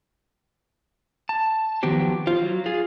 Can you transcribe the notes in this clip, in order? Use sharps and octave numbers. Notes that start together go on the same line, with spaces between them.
A5
D#3 F3 F#3 B3 G4 C5
F4 C5
F#3
F4 G#4